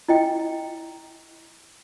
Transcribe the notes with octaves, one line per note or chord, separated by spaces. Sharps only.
E4 D#5 G5